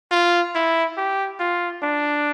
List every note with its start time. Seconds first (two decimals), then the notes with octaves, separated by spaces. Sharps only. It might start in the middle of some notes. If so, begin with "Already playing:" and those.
0.11 F4
0.55 E4
0.97 G4
1.40 F4
1.82 D4